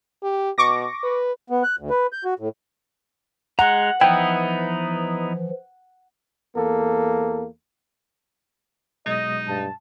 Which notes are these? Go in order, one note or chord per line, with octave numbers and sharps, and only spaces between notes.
G4
B2 C#6 D6 A#6
B4
B3
F#6
D2
B4
G6
F#4
A2
G#3 F#5 A#5
E3 F3 B3 D#4 E4 G5
E2 A#3 A4
B2 F#3 G#3 D#4 D#5
G2 A5